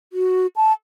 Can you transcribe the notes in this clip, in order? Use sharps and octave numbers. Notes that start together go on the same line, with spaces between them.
F#4
A5